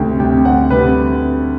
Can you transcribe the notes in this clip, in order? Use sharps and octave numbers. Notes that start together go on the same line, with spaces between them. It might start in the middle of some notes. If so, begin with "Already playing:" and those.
Already playing: D2 C3 G3 G5
C3 G3 G5
D2 F#5
C3 G3 B4